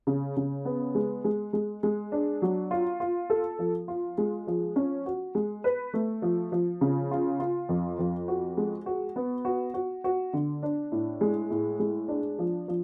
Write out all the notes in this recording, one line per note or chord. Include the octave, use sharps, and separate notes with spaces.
C#3
C#3
B3
G#3
G#3
G#3
G#3
D4
F#3
F4
F4
A4
F3
F4
G#3
F3
C#4
F#4
G#3
B4
A3
F3
F3
C#3
F4
F4
F2
F2
F#4
G#3
F#4
B3
F#4
F#4
F#4
D3
D4
A2
G#3
A2
G#3
D4
F3
F3